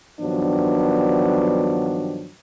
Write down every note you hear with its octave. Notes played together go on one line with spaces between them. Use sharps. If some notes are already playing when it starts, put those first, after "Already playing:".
G2 D#3 F3 F#3 B3 D4